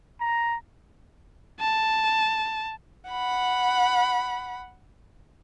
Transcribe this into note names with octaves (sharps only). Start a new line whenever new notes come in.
A#5
A5
F#5 B5